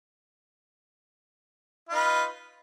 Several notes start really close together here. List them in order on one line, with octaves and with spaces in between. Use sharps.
F4 D#4 B4